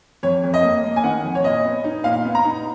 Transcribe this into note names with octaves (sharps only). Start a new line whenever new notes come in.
F2 C#5
F2
D#5
A#3
A#3
G#5
D#3 F#5
F2
C#5
A#2 D#5
B3
D#4
A#2 F5
B3
A#5
D#4